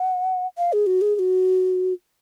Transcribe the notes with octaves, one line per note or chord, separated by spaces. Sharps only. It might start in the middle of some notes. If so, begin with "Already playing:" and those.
Already playing: F#5
F5
G#4
F#4
G#4
G#4
F#4